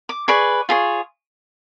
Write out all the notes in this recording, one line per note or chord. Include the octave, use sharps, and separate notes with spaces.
D6
G#4 B4 D5 C#6
F4 G#4 C#5